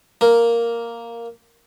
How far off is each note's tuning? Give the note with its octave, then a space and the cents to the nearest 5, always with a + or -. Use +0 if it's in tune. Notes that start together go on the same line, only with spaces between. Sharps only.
A#3 +0 A#4 +0